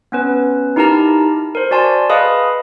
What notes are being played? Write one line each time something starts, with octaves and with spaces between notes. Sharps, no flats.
B3 C#4 B4
D#4 E4 G4 A#4 A5 A#5
A#4 C5
F#4 D5 G#5 A5 C6
G#4 B4 D#5 F5 B5 D#6